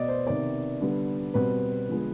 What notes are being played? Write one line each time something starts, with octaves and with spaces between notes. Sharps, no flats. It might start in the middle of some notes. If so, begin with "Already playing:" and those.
Already playing: B2 B3 D5 D#5
C5
C3 D#3 B3 D5
D3 G3 B3
B2 G3 C4 B4
D3 F3 G#3 B3